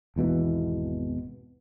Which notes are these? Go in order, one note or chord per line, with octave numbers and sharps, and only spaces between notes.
G#1 E2 B2 E3